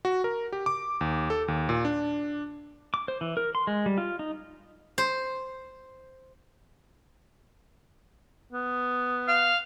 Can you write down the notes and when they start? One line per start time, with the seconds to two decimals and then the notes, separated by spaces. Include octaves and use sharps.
0.05 F#4
0.24 A#4
0.53 G4
0.66 D6
1.01 D#2
1.30 A4
1.48 D#2
1.69 A#2
1.85 D4
2.94 D6
3.08 C5
3.21 E3
3.37 A#4
3.55 C6
3.67 G#3
3.86 G3
3.98 F4
4.19 D#4
4.98 C5
8.53 B3
9.28 F5